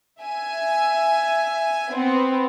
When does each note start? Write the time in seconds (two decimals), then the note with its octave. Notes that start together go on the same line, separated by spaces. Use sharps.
0.20 E5 G#5
1.93 B3 C4